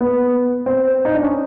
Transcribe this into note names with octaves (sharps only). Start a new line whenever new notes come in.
B3
C4
D#4
D4
C#4